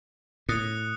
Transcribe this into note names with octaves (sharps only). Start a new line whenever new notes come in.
A2 D#6 F#6 C#7